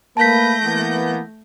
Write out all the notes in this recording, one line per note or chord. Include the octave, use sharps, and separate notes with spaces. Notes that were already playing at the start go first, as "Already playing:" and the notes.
A3 A#3 B4 A5 G6 A#6 B6
E3 A#3 B3